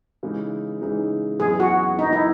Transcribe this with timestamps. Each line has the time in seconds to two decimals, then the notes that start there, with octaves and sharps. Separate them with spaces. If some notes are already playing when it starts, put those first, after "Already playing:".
0.23 C#3 E3 G#3 D#4
0.82 C#3 E3 G#3 D#4
1.40 F#2 E3 B3 G#4
1.60 F#4
1.99 F#2 E3 B3 D#4
2.13 E4